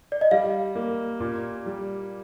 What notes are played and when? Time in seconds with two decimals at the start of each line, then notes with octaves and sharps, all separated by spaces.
0.12 D5
0.21 D#5
0.31 G3 F5
0.75 A#3
1.20 A#2
1.66 G3